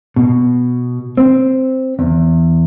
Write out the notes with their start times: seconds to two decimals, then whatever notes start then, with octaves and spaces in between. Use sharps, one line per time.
0.16 B2
1.17 C4
1.99 E2